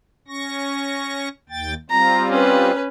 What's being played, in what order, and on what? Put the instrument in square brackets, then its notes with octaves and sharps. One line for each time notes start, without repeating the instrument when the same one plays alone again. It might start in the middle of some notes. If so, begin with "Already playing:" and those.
[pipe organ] C#4 C#6 A#6
D#2 G5 A6
[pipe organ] G3 C4 F4 [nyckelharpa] A#5
[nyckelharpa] C#4 B4